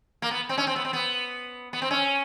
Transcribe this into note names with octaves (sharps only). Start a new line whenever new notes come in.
A#3
B3
C4
C#4
C4
B3
C4
B3
B3
C4
C#4